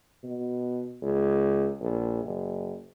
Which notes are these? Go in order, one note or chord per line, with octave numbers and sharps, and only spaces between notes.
B2
C#2
A#1
F#1